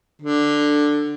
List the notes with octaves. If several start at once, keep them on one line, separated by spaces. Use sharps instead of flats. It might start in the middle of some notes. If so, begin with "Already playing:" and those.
D3